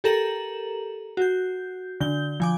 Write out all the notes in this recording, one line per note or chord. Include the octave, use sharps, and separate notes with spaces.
G4 A4 A#4 A#5 E7 F#7
F#4 G6
D3 G6 G7
F3 G#5 D6